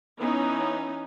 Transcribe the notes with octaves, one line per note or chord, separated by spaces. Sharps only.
E3 B3 C#4 D#4